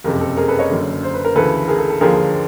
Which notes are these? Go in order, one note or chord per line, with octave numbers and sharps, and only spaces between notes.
F#1 F2 C3 G#4 A#4
A4
G#4 A#4
A4 B4
C#5 D#5
F#1 F#2 D3
C5
B4
A#4
D2 C#3 E3 A4 B4
G#4 A#4
A4
A4
D#2 D3 F3 G#4 A#4